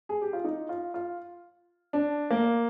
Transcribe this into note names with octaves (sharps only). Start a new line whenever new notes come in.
G#4
G4
F4
D#4
F4
F4
D4
A#3